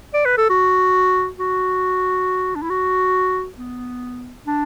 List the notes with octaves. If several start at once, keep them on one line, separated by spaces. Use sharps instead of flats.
D5
B4
A4
F#4
F#4
D4
E4
F#4
B3
D4